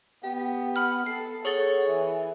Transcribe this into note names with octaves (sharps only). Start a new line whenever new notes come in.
B3 G4
F#5 B5 F6
A4 C7
G#4 A4 C#5 F#5 A6
E3